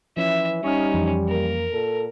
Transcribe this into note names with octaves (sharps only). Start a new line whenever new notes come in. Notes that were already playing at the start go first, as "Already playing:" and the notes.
E3 F3 C#4 E5
G3 C#4 D#4 C#6 D#6 F6
F2 E3 F3
A#3 A#4
A#2 A4